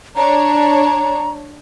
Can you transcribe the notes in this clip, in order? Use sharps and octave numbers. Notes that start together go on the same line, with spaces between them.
D4 C#5 A#5